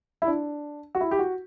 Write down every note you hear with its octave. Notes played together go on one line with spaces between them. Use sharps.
E4
D4
F#4
E4
G4
F#4